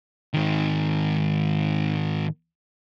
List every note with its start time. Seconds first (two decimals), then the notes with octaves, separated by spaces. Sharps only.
0.34 G#2 D#3